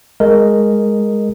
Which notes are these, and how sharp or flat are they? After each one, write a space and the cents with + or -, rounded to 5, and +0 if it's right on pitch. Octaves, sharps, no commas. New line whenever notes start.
G#3 +0 A#4 -5 D#5 +0